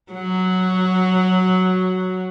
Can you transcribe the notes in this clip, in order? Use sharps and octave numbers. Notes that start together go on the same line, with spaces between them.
F#3 F#4